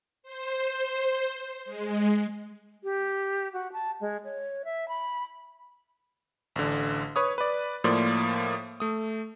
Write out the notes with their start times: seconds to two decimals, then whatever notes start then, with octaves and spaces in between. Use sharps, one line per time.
0.23 C5
1.65 G#3
2.84 G4
3.53 F#4
3.73 A5
4.01 G#3
4.24 C#5
4.65 E5
4.88 B5
6.56 A1 D3
7.16 B4 C#5 D#6
7.38 B4 D5
7.84 A2 F3 A#3 D5 C6
8.80 A3 D#6